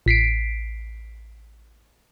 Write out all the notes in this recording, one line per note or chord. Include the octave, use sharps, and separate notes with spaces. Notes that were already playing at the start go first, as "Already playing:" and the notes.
A1 B6 C7 D7